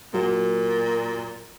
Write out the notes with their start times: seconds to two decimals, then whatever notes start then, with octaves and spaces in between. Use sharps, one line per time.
0.14 A#2 F#3 A#3